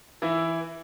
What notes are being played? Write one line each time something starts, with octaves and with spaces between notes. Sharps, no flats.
E3 E4